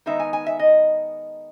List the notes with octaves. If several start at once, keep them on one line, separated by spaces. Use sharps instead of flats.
D#3 G#3 B3 D#4 E5
G#5
G#5
E5
D#5